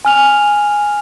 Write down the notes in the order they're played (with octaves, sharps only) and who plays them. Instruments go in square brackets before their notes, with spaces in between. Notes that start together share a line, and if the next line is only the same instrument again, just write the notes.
[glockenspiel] G#5 F6 F7